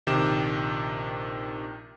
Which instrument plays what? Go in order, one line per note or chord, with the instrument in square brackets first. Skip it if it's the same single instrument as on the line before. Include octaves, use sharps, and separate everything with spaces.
[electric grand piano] A#1 C3 D#3 G4 D6 E7